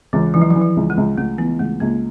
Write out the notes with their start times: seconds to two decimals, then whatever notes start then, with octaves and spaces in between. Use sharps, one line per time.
0.13 C#2 E3
0.34 E3 F3
0.41 F#3
0.50 F3
0.56 E3
0.62 F3
0.77 C#2
0.90 G#3
0.97 C#2
1.17 C#2 A3
1.38 E3 B3
1.59 C#2 A3
1.80 C#2 A#3